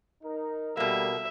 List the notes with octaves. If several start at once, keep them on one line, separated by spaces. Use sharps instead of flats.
D#4 A#4
B2 G3 A#3 A4 E5